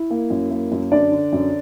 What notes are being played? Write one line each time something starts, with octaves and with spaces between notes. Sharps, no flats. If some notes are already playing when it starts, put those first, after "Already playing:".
Already playing: E4
A#3
F#2
A#3
F#2
D3 D4 D5
D3
F#2